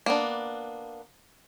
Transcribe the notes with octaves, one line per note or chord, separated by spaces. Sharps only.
A#3 B3 D4